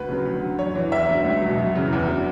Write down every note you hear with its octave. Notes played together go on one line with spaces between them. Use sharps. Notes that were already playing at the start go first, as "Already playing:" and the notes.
Already playing: D2 B4
C#3 F#3
D2
D3 F#3
F#2 C#5
E3
E2 E5
D3 F#3
C#2
B2 F#3
F#2
C#3 E3
E2
D3 F#3